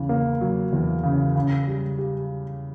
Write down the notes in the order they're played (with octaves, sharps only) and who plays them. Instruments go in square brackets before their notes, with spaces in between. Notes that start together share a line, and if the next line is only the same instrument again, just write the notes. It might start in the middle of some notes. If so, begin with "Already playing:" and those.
Already playing: [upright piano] E2 C#3
A#3
F#3
E2
C#3
C#3
G3
G4